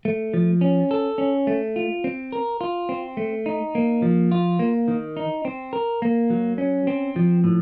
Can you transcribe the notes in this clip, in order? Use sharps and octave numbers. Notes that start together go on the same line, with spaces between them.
A3
F3
C#4
A4
C#4
A3
F4
C4
A#4
F4
C4
A3
D#4
A#3
F3
F4
A#3
D#3
D#4
C4
A#4
A#3
F#3
C#4
C4
F3
A2